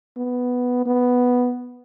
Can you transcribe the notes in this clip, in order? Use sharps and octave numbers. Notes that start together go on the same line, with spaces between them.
B3
B3